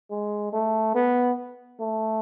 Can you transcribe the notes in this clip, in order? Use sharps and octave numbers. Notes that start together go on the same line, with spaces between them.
G#3
A3
B3
A3